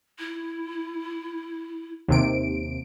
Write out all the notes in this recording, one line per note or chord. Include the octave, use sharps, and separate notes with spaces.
E4
D#2 C3 D7